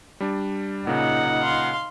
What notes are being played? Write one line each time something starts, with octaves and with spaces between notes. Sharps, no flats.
G3 D4
A#2 C#3 D#4 F#5
F5 C6